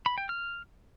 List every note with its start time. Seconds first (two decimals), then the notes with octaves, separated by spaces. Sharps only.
0.06 B5
0.18 G5
0.29 F6